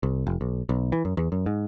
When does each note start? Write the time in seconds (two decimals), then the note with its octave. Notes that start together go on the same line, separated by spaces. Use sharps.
0.03 C2
0.27 F1
0.41 B1
0.69 B1
0.92 E3
1.05 F#2
1.17 E2
1.32 F#2
1.46 G#2